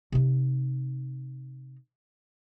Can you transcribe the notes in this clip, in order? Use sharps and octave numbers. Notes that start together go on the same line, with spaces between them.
C3 D#4